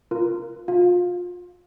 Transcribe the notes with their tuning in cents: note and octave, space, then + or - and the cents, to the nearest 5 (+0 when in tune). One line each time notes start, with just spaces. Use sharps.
F4 -10 A#4 +0
F4 +30 F5 +10